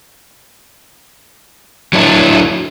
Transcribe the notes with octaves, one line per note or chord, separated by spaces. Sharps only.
F#3 D4 E4